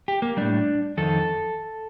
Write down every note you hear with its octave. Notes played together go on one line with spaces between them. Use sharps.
G4
A#3
A2 G3 D4
F2 D#3 A4